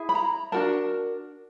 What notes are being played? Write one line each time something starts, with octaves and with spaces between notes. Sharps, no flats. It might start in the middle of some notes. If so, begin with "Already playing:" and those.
Already playing: E4 G#4
B5
A#5
D4 F#4 A#4 A5